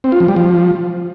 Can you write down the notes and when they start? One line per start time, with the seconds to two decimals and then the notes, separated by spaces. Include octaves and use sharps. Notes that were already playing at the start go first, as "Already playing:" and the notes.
0.04 C4
0.12 F4
0.20 F3
0.28 G3
0.36 F3